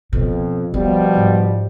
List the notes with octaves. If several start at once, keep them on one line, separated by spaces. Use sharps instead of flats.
F2 B2
B2 F3 G3 B3
G#2